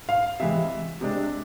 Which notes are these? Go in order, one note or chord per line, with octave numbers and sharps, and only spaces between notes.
F5
C3 E3 G#3 E5
C3 G#3 D4